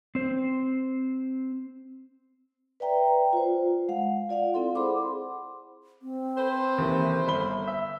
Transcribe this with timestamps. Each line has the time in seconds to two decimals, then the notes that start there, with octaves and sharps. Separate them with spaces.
0.15 C4 C5
2.80 B4 D5 E5 G5 A#5
3.33 F4 C5
3.88 G#3 F5 F#5
4.29 F4 D5 F5 F#5
4.54 C4 E4 A4 C6
4.75 G#4 C5 F#5 B5 C6 D6
6.02 C4
6.38 A4 B4 C5
6.78 D#2 C3 E3
7.27 G1 B5 G7
7.67 E5